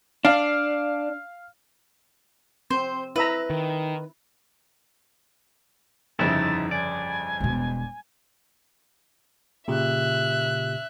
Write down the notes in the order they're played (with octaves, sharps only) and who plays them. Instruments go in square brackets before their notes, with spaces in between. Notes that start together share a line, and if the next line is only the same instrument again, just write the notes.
[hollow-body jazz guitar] D4 [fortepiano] F5
[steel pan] C4 [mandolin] C5
[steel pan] E4 E5 A#5 [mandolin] B4
[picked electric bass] D#3
[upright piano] G1 F2 C#3 [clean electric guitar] D#4 E4 E5 [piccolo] A6
[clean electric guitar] D5 [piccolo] G#5
[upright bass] E1 B2
[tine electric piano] A#2 C#3 G4 [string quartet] E5 F#6